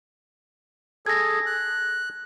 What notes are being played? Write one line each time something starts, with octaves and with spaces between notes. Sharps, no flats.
G#4 A4 G#6 A#6
F#6